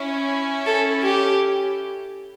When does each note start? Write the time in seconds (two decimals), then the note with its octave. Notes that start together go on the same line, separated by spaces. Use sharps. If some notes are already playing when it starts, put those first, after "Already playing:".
Already playing: C#4 E4
0.66 A4
1.03 G4